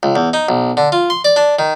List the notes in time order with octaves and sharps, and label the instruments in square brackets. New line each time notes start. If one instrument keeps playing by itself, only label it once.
[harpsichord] C#2
E2
D#4
B1
D3
F4
C6
D5
D4
D#3